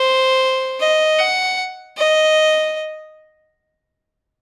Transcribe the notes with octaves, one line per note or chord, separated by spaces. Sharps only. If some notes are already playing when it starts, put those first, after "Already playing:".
Already playing: C5
D#5
F#5
D#5